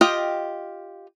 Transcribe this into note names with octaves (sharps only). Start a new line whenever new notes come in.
F4 G4 D#5 G5